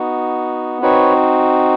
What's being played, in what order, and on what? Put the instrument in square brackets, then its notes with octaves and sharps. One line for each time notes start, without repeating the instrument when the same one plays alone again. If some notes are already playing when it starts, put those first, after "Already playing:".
Already playing: [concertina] B3 D#4 F#4
C4 D#4 F#4 B4 C#5